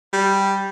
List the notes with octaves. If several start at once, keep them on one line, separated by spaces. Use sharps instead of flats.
G3